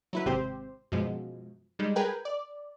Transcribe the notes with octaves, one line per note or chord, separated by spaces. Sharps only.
F#3 E4 B4
G#1 C3 C4 G4 C5
F#2 B2 F3 G#3
G3 G#3 D#4
G#4 A#4 B4 G5 G#5
D5